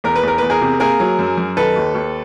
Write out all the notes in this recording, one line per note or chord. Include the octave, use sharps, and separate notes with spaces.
E2 A#4
B4
E2 A#4
E2 B4
G#4 A#4
C3
A#3 G#4 A#4
F#3
F#2
F#2
D#3 A4 B4
D#2
D#2